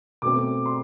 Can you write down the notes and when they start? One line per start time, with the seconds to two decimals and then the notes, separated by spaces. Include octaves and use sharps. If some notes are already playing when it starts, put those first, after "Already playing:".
0.22 B2 A3 C4 D6
0.66 C6